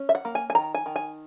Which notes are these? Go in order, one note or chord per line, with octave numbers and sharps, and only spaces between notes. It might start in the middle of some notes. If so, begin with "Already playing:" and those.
Already playing: C#4
E5
F#5
A#3
G#5
G#5
D#3 A#5
G#5
D#3
G#5